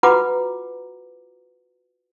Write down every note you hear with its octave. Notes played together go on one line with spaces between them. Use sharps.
F4 F#4 B4 F#5 A#5 D6